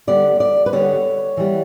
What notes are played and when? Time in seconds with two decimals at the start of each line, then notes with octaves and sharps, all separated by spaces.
0.07 D3 G3 B3 D5
0.40 D5
0.66 B4
0.72 D3 G3 B3 C#5
1.37 E3 G3 B3